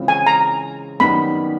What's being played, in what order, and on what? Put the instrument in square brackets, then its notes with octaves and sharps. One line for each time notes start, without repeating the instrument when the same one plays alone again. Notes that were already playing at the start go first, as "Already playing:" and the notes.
Already playing: [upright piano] C#3 E3 G#3 C4 F4
[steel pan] G#5
A#5
[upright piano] F#2 D#3 G3 B3 D#4 [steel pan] B5